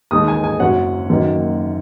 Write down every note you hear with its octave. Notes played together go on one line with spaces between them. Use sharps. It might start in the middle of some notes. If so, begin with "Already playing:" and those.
D#2 D#3 G#3 D#6
G#5
G#5
F#1 F#2 F#3 C#4 F#5
F#1 F#2 D#3 A#3